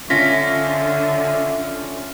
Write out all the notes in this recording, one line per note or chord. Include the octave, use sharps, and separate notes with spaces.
D3 C#4 F4 E5 A#6 B6